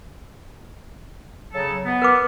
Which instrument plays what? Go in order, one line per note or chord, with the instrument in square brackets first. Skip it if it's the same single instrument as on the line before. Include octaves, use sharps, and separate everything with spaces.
[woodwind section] C#3 F#3 A4
B3
[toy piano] A#4 B4 D6